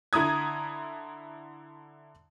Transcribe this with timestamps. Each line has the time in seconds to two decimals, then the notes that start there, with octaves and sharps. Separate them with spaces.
0.13 D3 E4 A#5 D#6 G#6